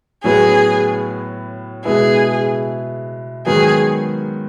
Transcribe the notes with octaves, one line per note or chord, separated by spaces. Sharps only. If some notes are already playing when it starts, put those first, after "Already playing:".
A2 F#3 B3 G#4
B2 G#3 B3 E4 G#4
G#2 D#3 F#3 B3 G#4